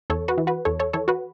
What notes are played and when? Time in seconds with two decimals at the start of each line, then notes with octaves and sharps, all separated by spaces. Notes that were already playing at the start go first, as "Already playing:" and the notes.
0.10 E2 A4 C#5
0.28 F#4 B4
0.38 E3
0.47 F#4 B4
0.65 E2 A4 C#5
0.79 A4 C#5
0.93 E3 A4 C#5
1.08 F#4 B4